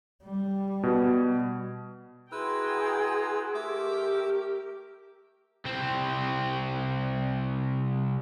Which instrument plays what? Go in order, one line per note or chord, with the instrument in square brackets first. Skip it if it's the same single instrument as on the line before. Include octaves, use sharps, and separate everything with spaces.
[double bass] G3
[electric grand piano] B2
[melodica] E4 B4 E6 [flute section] F#4 G#4 C6 [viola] G5 A#5
[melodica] A3 D6 E6 [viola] G4 A#4
[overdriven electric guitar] C2 C4